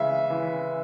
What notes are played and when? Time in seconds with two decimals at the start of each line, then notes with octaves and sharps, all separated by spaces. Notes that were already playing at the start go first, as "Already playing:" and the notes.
Already playing: C#3 E3 G#3 E5
0.30 E3